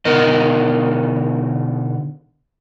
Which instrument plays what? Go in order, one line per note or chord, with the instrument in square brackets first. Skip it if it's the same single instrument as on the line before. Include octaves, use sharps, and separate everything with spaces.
[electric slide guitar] B2 D3 D#4 A#4 D#5